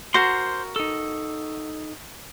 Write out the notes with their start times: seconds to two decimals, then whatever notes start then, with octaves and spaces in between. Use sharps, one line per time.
0.14 F#4 A#4 C5 C6
0.76 D#4 A4